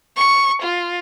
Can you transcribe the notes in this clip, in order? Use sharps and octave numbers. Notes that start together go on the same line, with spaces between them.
C#6
F4